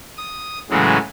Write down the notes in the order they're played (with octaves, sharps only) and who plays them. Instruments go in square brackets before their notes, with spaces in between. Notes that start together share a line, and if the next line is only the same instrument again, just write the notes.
[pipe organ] D#6
A2 C#3 E3 F#3 G#3